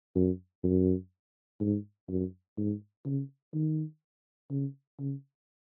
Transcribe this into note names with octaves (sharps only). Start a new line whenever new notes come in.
F#2
F#2
G#2
F#2
G#2
C#3
D#3
C#3
C#3